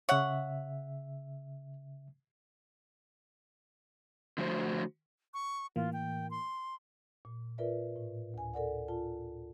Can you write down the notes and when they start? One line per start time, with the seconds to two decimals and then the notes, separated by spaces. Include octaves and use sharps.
0.09 C#3 C#5 E5 F#5
4.38 D3 F3 A3 F#4 C5
5.34 C#6
5.76 A2 E3 A#3 F4
5.93 G5
6.31 C6
7.25 A#2
7.58 F4 A#4 B4 D5 E5
7.96 A2
8.34 D2 G#5
8.54 A4 A#4 D5 F#5
8.88 F4 A5